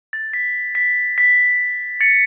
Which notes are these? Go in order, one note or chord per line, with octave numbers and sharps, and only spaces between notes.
A6
B6
B6
B6
A6 C#7